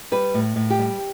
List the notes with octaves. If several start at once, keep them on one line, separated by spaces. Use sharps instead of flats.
G3 B4
A2
A2
G4
G3